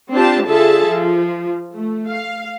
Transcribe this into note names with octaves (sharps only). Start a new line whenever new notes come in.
C4 D4 F4 G4 C5 A5
D3 F4 G#4 A4 E5 A5
F3
A3
F5